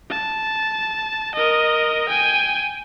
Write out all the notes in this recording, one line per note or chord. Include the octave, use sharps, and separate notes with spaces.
A5
A#4 D#5
G5 G#5